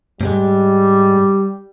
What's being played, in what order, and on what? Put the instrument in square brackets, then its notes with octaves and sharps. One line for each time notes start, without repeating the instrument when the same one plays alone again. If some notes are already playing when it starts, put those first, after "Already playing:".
[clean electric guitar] G#2 G#3 [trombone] G3